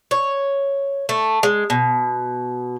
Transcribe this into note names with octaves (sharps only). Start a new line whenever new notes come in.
C#5
A3
G#3
B2